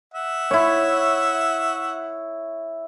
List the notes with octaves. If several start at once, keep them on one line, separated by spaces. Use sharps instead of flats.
E5 F#5
E4 C#5